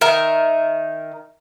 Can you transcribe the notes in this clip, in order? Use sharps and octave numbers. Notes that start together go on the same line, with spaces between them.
D#3 A#4 E5